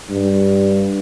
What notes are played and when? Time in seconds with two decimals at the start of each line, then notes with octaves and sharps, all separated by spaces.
0.10 G2